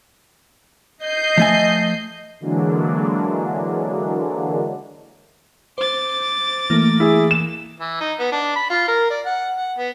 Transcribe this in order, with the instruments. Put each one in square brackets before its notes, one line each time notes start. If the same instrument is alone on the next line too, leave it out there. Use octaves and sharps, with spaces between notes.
[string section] D#5 G6 C7
[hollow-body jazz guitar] F3 A3 G#5
[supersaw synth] D3 E3 F#3 G#3 A#3 D4
[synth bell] C5 [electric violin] D6 A6
[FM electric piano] E3 A3 [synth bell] A#3
[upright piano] E4 G#4
E7
[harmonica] E3
D#4
B3
D4
B5
F4
A#4
D5
F#5
F#5
B3